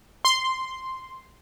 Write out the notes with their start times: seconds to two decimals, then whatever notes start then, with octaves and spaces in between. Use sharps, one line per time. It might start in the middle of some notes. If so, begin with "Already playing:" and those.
0.25 C6